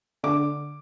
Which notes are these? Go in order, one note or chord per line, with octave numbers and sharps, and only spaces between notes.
D3 D6